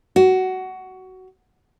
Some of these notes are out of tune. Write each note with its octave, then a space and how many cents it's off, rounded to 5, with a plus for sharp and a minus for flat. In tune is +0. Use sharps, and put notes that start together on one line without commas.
F#4 +15